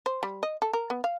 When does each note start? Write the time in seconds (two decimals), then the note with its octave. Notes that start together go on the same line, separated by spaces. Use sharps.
0.06 C5
0.23 G3
0.43 D#5
0.62 A4
0.73 A#4
0.90 B3
1.04 F5